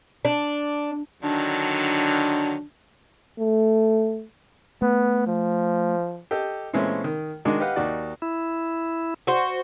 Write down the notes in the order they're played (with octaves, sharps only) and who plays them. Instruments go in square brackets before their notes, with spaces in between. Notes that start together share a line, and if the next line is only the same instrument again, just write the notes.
[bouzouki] D4
[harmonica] D3 D#3 F#3 [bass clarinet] D4
[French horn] A3
[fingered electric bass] A3 [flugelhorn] B3
[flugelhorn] F3
[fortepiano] G4 A4 D#5
A#2 E3 G#3 A3 C4 C#4
D#3
D#3 G#3 D4 D#4 F#4
G4 B4 D#5 F5 F#5
D#2 D#4 F#4 G4 D5
[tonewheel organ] E4
[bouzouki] F#4 C5